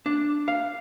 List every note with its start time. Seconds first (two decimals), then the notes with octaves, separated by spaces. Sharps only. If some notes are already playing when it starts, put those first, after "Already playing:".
0.06 D4
0.48 F5